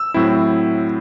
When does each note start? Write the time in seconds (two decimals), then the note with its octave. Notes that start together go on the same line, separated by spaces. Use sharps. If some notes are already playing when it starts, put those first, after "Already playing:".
Already playing: E6
0.14 A2 F#3 C4 E4